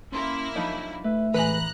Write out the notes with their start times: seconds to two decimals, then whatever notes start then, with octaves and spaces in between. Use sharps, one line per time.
0.12 A#3 C#4 E4 C6
0.56 F3 F#3 D4 D#4
1.04 A3 B4 E5
1.34 A1 E3 G#3 B4 A#5 B5 F#6